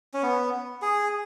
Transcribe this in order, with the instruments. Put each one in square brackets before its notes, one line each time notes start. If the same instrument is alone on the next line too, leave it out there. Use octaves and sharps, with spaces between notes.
[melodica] C#4
B3
G#4